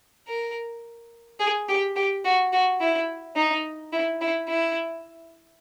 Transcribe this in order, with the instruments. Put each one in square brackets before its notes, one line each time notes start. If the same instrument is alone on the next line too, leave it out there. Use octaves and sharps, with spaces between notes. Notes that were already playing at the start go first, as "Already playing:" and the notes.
[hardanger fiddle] A#4
G#4
G4
G4
F#4
F#4
E4
D#4
E4
E4
E4